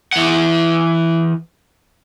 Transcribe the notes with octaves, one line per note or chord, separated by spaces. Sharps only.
E3 F#5